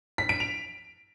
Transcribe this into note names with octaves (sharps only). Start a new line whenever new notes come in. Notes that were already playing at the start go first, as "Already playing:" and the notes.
B6
D7
F7